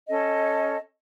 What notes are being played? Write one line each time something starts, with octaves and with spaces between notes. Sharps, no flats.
C#4 A4 D#5